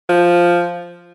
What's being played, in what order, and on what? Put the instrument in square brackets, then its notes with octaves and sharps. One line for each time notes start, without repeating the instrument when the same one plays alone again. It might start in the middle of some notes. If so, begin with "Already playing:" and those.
[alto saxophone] F3